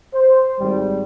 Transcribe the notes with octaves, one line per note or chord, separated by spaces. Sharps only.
C5
G#1 G3